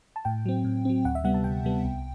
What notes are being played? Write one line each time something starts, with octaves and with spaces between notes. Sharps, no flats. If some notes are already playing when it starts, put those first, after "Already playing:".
A5
A2 G5
F#3 C4
A2
F#3 C4
D2 F#5
E5
C3 G3 B3 F#5
A5
D2 G5
C3 G3 B3
C2